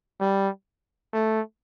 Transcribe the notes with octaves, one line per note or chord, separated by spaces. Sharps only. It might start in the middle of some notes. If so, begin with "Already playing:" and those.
G3
A3